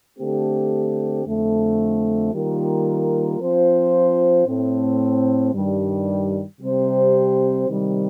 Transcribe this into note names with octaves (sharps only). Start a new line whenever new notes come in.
D3 A3 C4 G4
F2 D3 A3
D#3 G3 A#3 F4 A#4
F3 C4 F4 C5
A2 A3 C4
G2 D#3 G3
C3 G3 C4 G4 C5
C3 D#3 G3